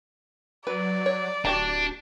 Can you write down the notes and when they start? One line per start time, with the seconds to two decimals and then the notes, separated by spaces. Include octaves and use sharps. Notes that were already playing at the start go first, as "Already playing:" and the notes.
0.67 F#3 B4 D5
1.06 C#5
1.45 D1 D4 F#4 G4 A#5